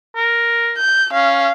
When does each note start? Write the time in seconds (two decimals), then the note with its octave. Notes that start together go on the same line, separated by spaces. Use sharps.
0.16 A#4
0.77 G6
1.13 C#4 F5